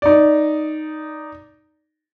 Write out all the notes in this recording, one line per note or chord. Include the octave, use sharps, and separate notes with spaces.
D#4 D5